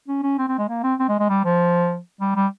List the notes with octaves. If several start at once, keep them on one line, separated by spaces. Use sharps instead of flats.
C#4
C#4
C4
C4
G#3
A#3
C4
C4
G#3
G#3
G3
F3
G3
G3